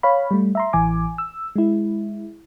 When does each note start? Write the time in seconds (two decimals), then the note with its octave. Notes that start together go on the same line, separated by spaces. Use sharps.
0.03 C#5 F5 B5
0.31 G3 A3
0.55 E5 A#5 C6
0.73 A1 E3 G#5 D6
1.18 E6
1.56 G#3 E4